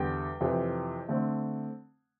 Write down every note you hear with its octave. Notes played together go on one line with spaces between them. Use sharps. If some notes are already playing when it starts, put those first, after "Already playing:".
Already playing: E2 D3 G3 G5
F2 C3 E3
D3 A3 C4